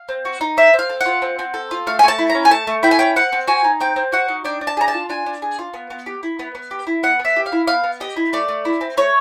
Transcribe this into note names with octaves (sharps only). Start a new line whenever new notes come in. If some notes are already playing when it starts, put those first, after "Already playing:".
Already playing: F5
C4
F#4
D#4
C4 E5
C4
F5
A4
F#5
F4
C4
C4
A4
F4
A3 F5
G#5
A3 A5
E4
C#4 A#5
G#5
A3 A5
A3
E4 G5
G#5
C#4 G5
C4 F#5
C4
F#4 G#5
D#4
C4 G5
C4
F#4 F#5
D#4
D4 G5
D4
A5
G#4 A#5
A5
F4
D4 G#5
D4
G#4
F4
B3
B3
G4
E4
B3
B3
G4
E4
B3 F#5
B3
E5
G4
F5
E4
B3 F5
B3
G4 D#5
E4
A3 D5
A3
E4
C4
A3 C#5